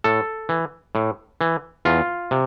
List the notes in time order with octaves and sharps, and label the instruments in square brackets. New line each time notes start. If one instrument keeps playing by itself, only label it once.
[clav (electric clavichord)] A2 A4
E3
A2
E3
E2 F4
C3